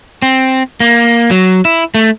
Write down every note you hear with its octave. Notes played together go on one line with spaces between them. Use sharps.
C4
A#3
F#3
E4
A3